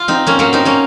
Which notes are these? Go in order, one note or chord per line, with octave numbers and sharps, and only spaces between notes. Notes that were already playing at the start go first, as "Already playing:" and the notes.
Already playing: F4
C4 D#4
A#3 C#4
F#3 A#3
C4 D#4
A#3 C#4